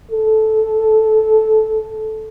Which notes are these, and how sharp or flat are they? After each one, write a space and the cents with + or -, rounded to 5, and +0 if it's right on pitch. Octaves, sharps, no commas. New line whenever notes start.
A4 -10